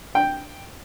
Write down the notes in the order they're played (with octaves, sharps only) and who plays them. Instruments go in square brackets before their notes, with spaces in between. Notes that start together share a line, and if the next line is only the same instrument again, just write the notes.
[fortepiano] G5